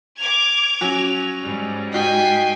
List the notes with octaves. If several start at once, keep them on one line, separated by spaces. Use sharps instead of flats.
D6 G#6 F7
F#3 C#4 F#4
G#2 G3
D#4 F#4 D#5 G5 G#5 B6 C7